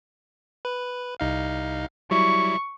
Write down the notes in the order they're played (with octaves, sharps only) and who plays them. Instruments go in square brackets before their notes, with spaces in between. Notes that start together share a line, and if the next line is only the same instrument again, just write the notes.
[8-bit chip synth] B4
C2 D#4 F5
[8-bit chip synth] F#3 G3 E4 [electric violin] C#6